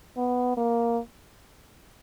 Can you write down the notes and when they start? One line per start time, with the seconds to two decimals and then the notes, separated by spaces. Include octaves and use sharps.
0.17 B3
0.57 A#3